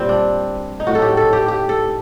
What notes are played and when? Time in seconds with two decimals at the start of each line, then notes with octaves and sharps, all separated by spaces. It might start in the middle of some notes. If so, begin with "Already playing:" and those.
Already playing: A#2 G3 C4
0.09 D4
0.80 D#4
0.87 A2 F#3 F#4
0.95 A4
1.02 G4
1.17 A4
1.33 G4
1.48 G4
1.69 A4